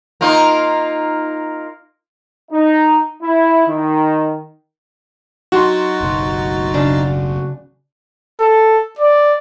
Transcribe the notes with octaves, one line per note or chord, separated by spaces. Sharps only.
A#3 D#4 F4
D#4
E4
D#3
F#3 D#4 F#4 C6 A6
F#1 B1
C#3 D4
A4
D5